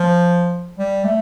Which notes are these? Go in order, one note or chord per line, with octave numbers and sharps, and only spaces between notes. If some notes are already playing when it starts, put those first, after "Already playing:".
Already playing: F3
G3
A3